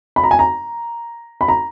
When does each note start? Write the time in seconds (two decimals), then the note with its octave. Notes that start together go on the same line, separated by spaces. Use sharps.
0.16 B5
0.24 A#5
0.31 G#5
0.39 A#5
1.41 B5
1.48 A#5